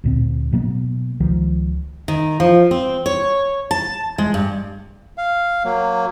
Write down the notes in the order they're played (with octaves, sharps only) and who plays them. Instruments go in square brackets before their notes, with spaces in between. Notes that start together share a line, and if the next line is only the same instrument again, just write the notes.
[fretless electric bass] D2 A#2 C4
B2 F#3 A#3 B3
C#2 D#3 F3
[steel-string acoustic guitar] D#3
F3
C4
C#5
A5
G#3
G2
[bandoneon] F5
F#3 A#3